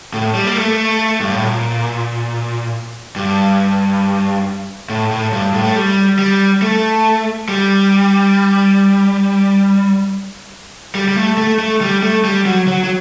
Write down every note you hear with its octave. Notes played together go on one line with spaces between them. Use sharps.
A2
G3
A#3
A3
G2
A2
A#2
G2
A2
A2
G2
A2
A3
G3
G3
A3
G3
G3
G3
A3
A3
A3
G3
A3
G3
F#3
F#3
F#3